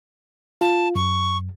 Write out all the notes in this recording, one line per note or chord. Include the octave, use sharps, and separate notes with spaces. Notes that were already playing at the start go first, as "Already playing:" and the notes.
F4 A5
F#2 C#6